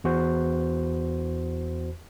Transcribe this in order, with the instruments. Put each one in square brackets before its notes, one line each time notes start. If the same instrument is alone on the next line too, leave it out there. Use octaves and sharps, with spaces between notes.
[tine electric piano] E2 F#4 C5